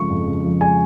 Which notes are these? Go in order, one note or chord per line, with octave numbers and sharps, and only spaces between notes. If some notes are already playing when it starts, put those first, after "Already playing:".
Already playing: C#3 F3 G#3 C#6
F2
C#3
F3
G#3 G#5